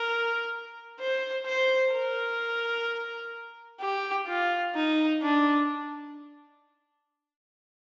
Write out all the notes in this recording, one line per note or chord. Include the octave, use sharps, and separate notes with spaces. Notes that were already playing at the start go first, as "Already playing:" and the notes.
Already playing: A#4
C5
C5
A#4
G4
F4
D#4
D4